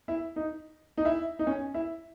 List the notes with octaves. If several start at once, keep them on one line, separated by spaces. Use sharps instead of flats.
E4
D#4
D#4
E4
D#4
C#4
E4